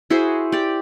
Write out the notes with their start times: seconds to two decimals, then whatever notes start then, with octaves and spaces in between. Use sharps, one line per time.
0.10 E4 F#4 G#4 C5
0.52 G4 D5